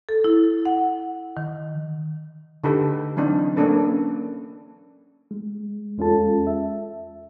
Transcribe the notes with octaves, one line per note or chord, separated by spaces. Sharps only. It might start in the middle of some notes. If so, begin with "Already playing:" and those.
A4
E4
F#5
D#3
D3 D#4 G4 A4 B4
E3 F#3 C4 D4 D#4
A#3 C#4 D4 A4 B4
G#3
E2 G#3 C#4 F4 A4 A5
E5